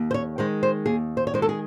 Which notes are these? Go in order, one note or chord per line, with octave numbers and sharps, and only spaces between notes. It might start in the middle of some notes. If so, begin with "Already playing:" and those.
Already playing: D#2
C5
C#5
D#3 G#3 C5
C5
D#2 G#4
C5
C#5
D#3 G#3 C5
A4
G#4